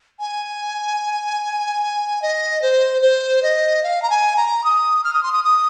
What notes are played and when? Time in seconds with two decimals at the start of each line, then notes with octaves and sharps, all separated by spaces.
0.20 G#5
2.22 D#5
2.62 C5
3.02 C5
3.43 D#5
3.83 F5
4.02 A#5
4.10 G#5
4.37 A#5
4.64 D#6
5.04 F6
5.14 D#6
5.23 C6
5.33 D#6
5.44 D#6